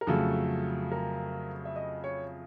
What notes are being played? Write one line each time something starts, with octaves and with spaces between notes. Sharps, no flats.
A#4
F2 C#3 F#3 A3 A4
A#4
E5
D#5
C#5